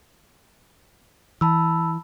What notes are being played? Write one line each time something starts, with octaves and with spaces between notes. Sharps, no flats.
E3 A5 B5 E6